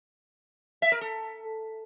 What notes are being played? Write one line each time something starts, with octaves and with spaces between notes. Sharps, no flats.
E5
A#4
A4